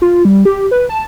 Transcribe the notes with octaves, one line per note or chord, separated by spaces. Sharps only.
F4
G3
G4
B4
A5